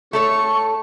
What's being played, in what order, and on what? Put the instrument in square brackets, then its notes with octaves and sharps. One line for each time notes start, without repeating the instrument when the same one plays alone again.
[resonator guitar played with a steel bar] A3 A4 C#5 [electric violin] C#6